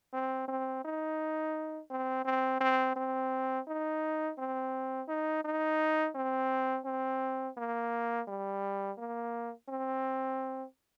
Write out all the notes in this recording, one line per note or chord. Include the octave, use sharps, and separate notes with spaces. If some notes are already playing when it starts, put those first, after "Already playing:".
C4
C4
D#4
C4
C4
C4
C4
D#4
C4
D#4
D#4
C4
C4
A#3
G3
A#3
C4